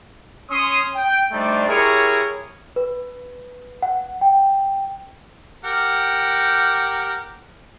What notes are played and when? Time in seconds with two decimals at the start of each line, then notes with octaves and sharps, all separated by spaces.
0.51 C#4 C#5 C6 D#6
0.95 G5
1.32 G3 A3 D4 D#4 C5 D5
1.68 E4 G4 G#4 A#4 C#5
2.76 B4
3.82 F#5
4.21 G5
5.64 G4 A#4 F#5